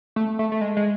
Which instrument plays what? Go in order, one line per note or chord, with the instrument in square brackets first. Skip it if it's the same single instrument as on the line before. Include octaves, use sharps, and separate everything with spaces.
[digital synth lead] A3
A3
A3
G#3
G#3